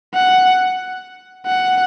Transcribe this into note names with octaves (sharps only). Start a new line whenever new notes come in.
F#5
F#5